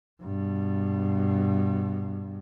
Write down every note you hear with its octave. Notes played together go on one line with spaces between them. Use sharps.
G2 B2